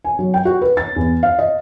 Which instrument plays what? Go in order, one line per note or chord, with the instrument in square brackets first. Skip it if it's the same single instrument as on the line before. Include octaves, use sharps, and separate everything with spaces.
[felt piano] G#5
F#3
G5
F#4
B4
A6
E2
F5
D#5